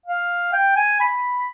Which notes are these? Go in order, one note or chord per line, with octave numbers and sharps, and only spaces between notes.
F5
G5
G#5
B5